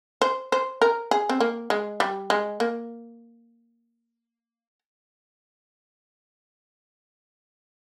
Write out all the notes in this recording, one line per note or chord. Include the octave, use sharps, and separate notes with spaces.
C5
C5
A#4
G#4
C4
A#3
G#3
G3
G#3
A#3